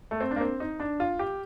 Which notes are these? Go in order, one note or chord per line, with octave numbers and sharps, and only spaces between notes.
A3
C4
D4
A#3
C4
D#4
D4
F4
G4